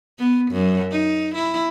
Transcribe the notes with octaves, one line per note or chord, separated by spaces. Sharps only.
B3
F#2
D#4
E4